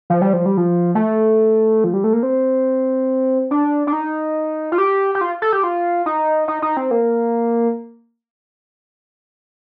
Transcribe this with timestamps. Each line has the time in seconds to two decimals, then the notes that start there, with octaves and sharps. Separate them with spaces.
0.10 F3
0.22 G3
0.33 F3
0.46 G3
0.57 F3
0.95 A3
1.84 F3
1.94 G3
2.04 A3
2.13 A#3
2.23 C4
3.51 D4
3.87 D4
3.93 D#4
4.72 F4
4.78 G4
5.15 G4
5.21 F4
5.42 A4
5.52 G4
5.63 F4
6.06 D#4
6.48 D#4
6.62 D#4
6.77 C4
6.91 A#3